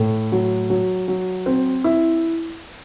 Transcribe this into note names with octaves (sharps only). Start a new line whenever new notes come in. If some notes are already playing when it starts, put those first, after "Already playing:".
Already playing: A2
F#3
F#3
F#3
C4
E4